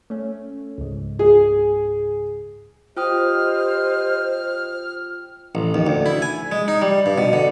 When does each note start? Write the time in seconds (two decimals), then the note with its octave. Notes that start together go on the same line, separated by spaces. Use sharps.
0.10 A3 C#4
0.78 C#2 G#2
1.19 G#4
2.97 F4 G4 C5 D#5 G5 D#6 F6
5.55 A1
5.74 D#2
5.86 D2
6.06 E4
6.22 G#5
6.52 G#3
6.68 D#4
6.82 G3
7.06 G2
7.18 B2
7.33 D3